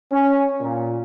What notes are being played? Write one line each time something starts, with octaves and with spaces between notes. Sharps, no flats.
C#4
A#2